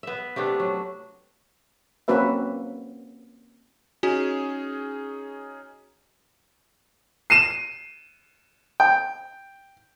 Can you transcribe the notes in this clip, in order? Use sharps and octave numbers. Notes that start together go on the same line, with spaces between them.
B3 E5
C3 A3 B3 D4
F#3
A#3 C4 C#4 F#4 B4 E5
C#4 D#4 F#4 G#4
C7 D#7 E7
G5